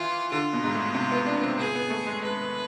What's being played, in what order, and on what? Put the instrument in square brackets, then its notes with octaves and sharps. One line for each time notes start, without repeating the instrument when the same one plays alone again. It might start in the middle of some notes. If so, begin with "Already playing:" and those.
Already playing: [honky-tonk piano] E3 [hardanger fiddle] F4
[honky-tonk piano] D3 [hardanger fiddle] F4
[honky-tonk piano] B2
G#2
A2
C3
B3
D4
B3
C4
[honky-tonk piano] B3 [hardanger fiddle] G#4
[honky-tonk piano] B3
A3
G#3
[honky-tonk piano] G#3 [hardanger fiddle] B4